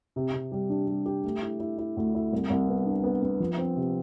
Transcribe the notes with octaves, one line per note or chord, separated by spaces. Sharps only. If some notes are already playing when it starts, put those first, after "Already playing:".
C3
C3
G3
D4
G3
G4
A3
E4
E4
E4
D2
E4
C2
C2
B3
D4
B3
B3
F3
C4
C3